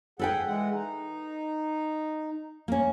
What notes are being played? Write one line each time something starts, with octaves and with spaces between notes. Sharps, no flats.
G#4 A4 B4 F#5 G5
E3 G#3 F#5
D#4
A#3 C#4